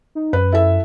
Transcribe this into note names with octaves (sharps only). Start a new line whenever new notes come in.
D#4
F#2 B4
E4 A4 E5